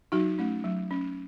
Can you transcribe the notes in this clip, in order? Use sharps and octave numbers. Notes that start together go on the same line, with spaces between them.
F#3 D#4 F#4
A3 C#4
F#3
C#4